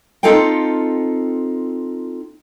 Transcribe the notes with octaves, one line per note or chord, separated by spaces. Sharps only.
C4 D#4 F4 A4 F5 G5